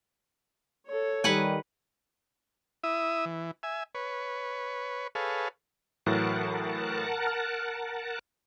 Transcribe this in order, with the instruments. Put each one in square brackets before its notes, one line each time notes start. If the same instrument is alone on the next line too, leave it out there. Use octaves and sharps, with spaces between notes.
[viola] A4 C#5
[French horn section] D#3 G3 [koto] B4 F#5 G#5
[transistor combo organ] E4 E5 D#6
E3
E5 G#5
B4 C#5
G#4 A4 B4 C#5 F5
[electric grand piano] A2 E3 F#3 [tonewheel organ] A#4 F#5 A5
[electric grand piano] F6